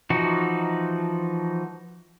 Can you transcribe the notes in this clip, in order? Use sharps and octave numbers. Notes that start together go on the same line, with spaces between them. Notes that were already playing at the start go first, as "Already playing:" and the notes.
E3 F3 D#4 F#4